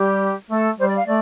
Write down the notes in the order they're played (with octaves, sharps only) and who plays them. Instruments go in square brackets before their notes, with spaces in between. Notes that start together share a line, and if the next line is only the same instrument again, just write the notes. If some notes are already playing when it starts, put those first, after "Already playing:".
Already playing: [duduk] G3 [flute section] G4
[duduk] A3 [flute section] A4
[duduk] G3 [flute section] C5
[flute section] D5
F5
[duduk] A3 [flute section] D5